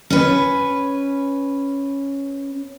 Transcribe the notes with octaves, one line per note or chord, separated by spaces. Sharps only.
C#4 B4